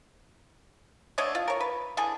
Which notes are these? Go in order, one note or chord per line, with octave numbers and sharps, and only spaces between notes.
D3 A3 C#5 D#5
F4
A#4 C#5
B4
D3 E3 G#4 A4